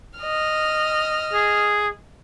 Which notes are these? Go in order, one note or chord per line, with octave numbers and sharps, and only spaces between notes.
D#5 F6
G#4